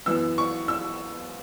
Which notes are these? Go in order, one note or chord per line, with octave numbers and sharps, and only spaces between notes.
F#2 E3 B3 E6
C#6
E6